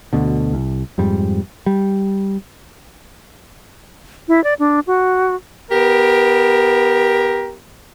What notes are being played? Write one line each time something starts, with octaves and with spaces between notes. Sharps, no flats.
D2 B2 D3
C2
F2 G#2 G3
G3
E4
D5
D4
F#4
B3 G4 A#4